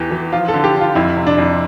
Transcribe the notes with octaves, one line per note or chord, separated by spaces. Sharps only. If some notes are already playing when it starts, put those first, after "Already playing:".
Already playing: E2 E3 G4
E3
F3 F4
A4
D3
G4
D3
F4
F2 E4
C3
D4
F2